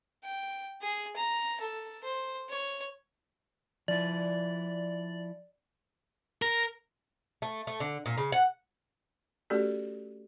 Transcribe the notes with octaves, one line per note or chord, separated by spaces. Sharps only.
G5
G#4
A#5
A4
C5
C#5
F3 E4 D5
A#4
A3
A3
D3
A#2
C#3
F#5
A3 C#4 F#4 G4 A4 D5